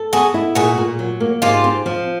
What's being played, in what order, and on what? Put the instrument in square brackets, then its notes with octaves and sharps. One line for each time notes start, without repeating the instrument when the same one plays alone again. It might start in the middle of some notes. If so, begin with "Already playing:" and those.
Already playing: [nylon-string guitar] A4
[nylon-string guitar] B3 [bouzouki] F#4 G#4
[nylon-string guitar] E4
[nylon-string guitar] A#2 [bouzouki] F#4 G#4
[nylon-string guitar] A#2
F#3
A#3
[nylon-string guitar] G#2 [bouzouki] F4 G4
[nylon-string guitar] C4
F3